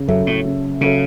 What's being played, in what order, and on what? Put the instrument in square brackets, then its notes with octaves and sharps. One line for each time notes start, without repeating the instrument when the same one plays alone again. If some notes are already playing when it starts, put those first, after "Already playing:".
Already playing: [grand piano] C#3
[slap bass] F#2 [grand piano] F#3 C#4 A4 E5
[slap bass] A2
[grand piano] C#3
[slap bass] C#3 [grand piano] F#3 C#4 A4 E5